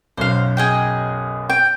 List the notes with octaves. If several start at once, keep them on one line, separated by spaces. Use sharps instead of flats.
B1 F#2 C5 F5
G#4 D#5 G5
G5